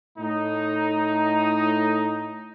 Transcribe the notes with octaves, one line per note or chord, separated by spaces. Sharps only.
A2 D#4